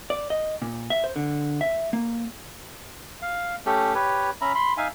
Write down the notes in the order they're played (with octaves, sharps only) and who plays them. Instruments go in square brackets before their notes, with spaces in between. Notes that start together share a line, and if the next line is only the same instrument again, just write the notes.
[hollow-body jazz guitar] D5
D#5
A#2
E5
C5
D3
E5
A#3
[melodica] F5
A3 C#4 G4 A4
G4 B4 C#5
C#4 E5 A#5 B5
B5 C6
D#4 E5 F5 G#5